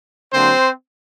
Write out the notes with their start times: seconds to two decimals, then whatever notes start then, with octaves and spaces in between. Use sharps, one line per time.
0.32 D3 F#3 A#3 C4 D4 C5